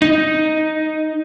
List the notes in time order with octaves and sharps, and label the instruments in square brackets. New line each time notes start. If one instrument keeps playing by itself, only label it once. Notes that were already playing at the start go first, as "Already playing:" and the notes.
[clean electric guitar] D#4